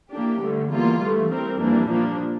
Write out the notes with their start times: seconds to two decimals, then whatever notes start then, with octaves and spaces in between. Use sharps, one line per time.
0.12 E3 A#3 D4 G4
0.42 G2 D3 A3
0.71 E2 E3 G3 A#3 F4
1.02 G2 E3 A3
1.31 E3 G3 C4 G4 A#4
1.60 F2 E3 G3 A#3 D4
1.89 A#2 F3 A#3 D4